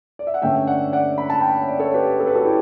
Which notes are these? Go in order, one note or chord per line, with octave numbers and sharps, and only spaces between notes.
D5
E5
F#5
G2 D3 A3 C#4 E5 G5
D5 F#5
D5 F#5
B5
A5
G5 B5
C#5
D5
A4 C#5
G4 B4
A4
B4
F#4 A4
E4 G4